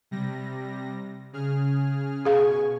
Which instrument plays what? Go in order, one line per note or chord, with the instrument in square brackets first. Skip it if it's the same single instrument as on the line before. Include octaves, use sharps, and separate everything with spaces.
[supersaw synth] C3 G3 A#6
C#3 G#4 F6
[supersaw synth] B2 G#5 C#6 [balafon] G#4 F5